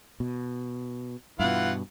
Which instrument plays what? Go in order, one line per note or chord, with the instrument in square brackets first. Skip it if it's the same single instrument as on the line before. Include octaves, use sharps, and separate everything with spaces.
[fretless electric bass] B2
[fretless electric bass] G2 B2 [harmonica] E3 F4 F#5